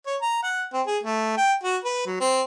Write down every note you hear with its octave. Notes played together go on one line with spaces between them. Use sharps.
C#5
A#5
F#5
C4
G#4
A3
G5
F#4
B4
F#3
C4